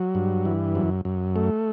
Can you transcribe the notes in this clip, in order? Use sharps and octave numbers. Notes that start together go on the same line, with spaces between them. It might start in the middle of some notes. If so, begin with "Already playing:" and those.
Already playing: F#3
G2
E3
F#2
F#2
A3